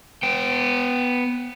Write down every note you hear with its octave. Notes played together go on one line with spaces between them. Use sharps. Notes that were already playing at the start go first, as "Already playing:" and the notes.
B3 G5